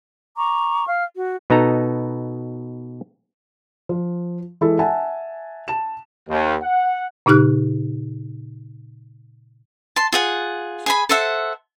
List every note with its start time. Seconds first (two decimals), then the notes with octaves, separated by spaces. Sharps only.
0.36 A#5 C#6 D6
0.87 F5 F6
1.15 F#4
1.50 B2 B3 D#4 A4 A#5
3.89 F3
4.61 E3 G#3 E4 A4
4.79 E5 F#5 G#5 A5
5.68 A5 E7
6.29 D#2
6.63 F#5
7.26 A#2 C#3 D#4 G4 F6 F#6
9.96 A5 C6
10.12 F4 G#4 F#5
10.86 G#4 G#5 B5
11.09 A4 C5 E5 F#5